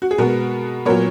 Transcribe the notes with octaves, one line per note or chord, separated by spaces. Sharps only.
F#4
G#4
B2 G#3 B3 F#4 A#4
A#2 F#3 B3 A#4 C#5